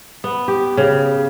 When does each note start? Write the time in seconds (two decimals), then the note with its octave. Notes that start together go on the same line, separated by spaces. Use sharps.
0.24 B3
0.48 G4
0.77 C#3